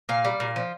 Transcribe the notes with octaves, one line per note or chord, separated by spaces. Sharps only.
A#2 F5
G3
A#2
F3